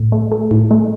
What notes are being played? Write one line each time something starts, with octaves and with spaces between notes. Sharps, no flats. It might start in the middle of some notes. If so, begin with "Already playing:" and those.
Already playing: A2
A3
A3
A2
A3